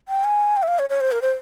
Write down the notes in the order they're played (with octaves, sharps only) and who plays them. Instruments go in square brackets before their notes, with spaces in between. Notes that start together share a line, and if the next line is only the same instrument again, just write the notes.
[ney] G5
G#5
G5
E5
F5
C#5
C#5
C5
A#4
C5